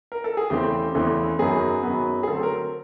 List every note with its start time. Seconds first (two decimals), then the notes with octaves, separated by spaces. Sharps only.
0.12 A#4
0.24 A4
0.37 G#4
0.50 E2 C#3 E3 A3 C4 G4
0.95 E2 C#3 E3 A3 C4
1.39 F#2 D#3 F#3 B3 G#4
1.83 F#2 D#3 F#3 B3
2.23 G#4
2.28 D3 F#3 A3 C4 A4
2.43 A#4